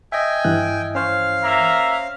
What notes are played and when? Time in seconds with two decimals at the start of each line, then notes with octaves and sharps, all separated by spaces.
0.12 D#5 E5 G5 G#5
0.44 G2 E3 F#6
0.95 C#4 C5 C#5 F5
1.42 A#3 E5 A#5